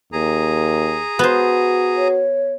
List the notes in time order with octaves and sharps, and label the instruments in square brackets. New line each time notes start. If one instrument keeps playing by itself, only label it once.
[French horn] D#2 [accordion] G#4 A#5
[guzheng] B3 C5 [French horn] F#4
[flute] C#5